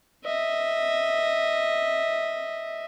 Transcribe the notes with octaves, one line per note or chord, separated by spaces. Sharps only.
D#5 E5